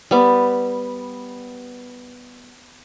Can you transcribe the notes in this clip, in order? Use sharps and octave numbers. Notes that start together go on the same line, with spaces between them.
G3 B3